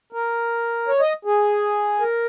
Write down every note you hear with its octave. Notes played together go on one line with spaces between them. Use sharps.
A#4
C#5
D#5
G#4
A#4